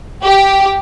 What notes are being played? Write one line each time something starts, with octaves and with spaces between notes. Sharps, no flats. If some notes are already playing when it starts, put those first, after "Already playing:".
G4